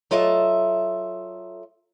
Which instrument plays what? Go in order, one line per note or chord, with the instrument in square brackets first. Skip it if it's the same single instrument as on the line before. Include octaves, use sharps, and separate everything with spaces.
[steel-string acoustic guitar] F#3 F4 A4 D#5 E5